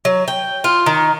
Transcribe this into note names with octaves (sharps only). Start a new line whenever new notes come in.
F#3
G5
F4
D#3